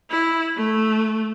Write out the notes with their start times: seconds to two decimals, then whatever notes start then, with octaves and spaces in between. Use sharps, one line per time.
0.10 E4
0.57 A3